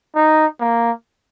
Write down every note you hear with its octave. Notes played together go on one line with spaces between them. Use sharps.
D#4
A#3